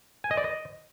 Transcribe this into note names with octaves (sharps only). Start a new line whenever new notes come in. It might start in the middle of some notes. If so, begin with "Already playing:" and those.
G#5
D#5
D5
D#5